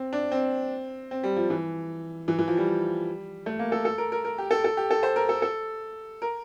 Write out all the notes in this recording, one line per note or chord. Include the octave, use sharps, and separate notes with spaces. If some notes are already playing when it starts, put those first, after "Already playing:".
Already playing: C4
D4
C4
C4
G3
F3
E3
E3
E3
F3
G3
A3
A#3
A4
A4
A#4
A#4
A#4
G4
A4
A4
G4
A4
C5
A#4
A4
A4
A#4